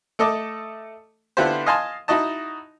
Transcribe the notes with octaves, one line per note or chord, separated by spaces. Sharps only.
A3 A4 D#5 D6
D3 B3 E4 F4 G4 C5
D#5 F5 G#5 A5 C6
D#4 E4 F#4 D#5 A5